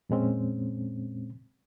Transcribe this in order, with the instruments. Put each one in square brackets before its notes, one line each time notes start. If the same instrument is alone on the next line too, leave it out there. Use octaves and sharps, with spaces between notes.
[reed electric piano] F2 A#2 G#3 C4 C#4